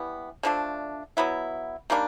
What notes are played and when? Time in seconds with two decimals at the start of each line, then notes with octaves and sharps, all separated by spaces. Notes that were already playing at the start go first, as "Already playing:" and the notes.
Already playing: E3 G3 B3
0.43 D3 F3 A3 D4
1.17 F#3 B3 E4
1.90 D#3 G3 A#3 D4